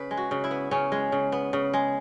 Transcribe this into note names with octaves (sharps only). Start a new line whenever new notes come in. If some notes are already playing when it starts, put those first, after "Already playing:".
Already playing: C#3 B4
G#3
F#4
C#3
E4
B3
C#3 C#4
G#3
C#3
B3
C#3
G#3